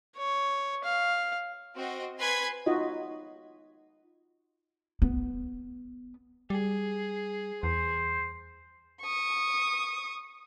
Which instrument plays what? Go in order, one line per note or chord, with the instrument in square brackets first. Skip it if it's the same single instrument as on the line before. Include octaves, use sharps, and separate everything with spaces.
[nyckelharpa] C#5
F5
[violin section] C4 F#4 D#5
B4 G#5 C6 G#6 B6
[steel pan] D#4 F4 F#4 D#5
[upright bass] B3
[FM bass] G3 [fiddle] G#4
[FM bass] E2 [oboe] C5
[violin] C#6 D#6